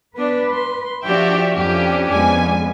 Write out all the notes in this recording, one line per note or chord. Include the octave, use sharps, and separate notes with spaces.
B3 D4 B4
C6
F3 D4 F#4 G4 D5 E5 G5
F2 C#4 D4 G4
F2 G#3 B3 G#5